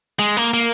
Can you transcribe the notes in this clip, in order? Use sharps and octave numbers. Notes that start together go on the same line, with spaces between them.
G#3
A#3
A#3